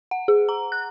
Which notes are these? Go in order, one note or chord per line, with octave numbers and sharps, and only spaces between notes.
F#5
G#4
A#5
F#6